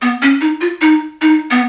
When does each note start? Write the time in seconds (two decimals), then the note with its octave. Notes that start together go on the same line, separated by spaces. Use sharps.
0.02 B3
0.22 C#4
0.41 D#4
0.61 F4
0.81 D#4
1.22 D#4
1.51 B3